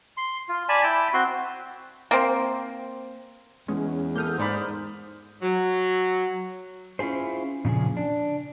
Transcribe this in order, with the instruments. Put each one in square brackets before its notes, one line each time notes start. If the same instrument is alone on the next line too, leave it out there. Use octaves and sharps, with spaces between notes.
[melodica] C6
F4
D5 G#5 A5 B5
E4 G5 A5 B5
C4 F#4 C6
[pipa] A#3 C4
[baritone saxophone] E2 [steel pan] G#3 [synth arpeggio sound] C#4
[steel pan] A#3 A4 [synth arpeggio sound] D#6 F6 G6
[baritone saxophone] G#2 [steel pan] C5 D5 B5
[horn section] F#3
[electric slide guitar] C#4 E4 F4 G#4 C5
A#2 C#3 F3 G#4
D4